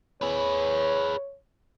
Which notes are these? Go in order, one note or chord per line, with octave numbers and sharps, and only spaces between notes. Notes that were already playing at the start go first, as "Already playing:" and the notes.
G#4 B4 C#5